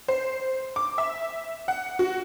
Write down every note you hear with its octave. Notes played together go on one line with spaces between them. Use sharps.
C5
D6
E5
F#5
F#4